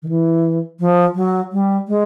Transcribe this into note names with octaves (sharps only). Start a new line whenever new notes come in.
D#3
E3
F3
F#3
G3
G#3